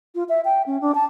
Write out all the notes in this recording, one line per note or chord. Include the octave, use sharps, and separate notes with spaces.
F4
E5
G5
C#4
D4
A5